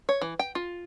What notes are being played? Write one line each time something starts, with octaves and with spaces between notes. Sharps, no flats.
C#5
E3
G5
F4